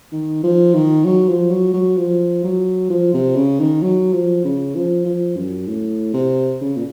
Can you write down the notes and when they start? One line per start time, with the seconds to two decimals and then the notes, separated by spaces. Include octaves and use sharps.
0.12 D#3
0.43 F3
0.74 D#3
1.05 F#3
1.28 F3
1.50 F#3
1.74 F#3
1.97 F3
2.44 F#3
2.90 F3
3.14 C3
3.36 C#3
3.60 D#3
3.82 F#3
4.13 F3
4.45 C#3
4.76 F3
5.05 F3
5.36 F#2
5.67 A2
6.14 C3
6.61 C#3
6.77 A#2